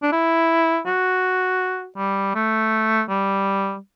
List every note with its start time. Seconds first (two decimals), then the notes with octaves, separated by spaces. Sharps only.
0.02 D4
0.12 E4
0.86 F#4
1.97 G3
2.35 A3
3.09 G3